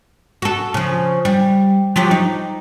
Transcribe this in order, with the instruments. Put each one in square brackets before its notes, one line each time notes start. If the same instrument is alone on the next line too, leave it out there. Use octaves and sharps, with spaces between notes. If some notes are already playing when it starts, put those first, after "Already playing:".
[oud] F#4 A4
C#3 F3
G3
F3 F#3 G4
D#4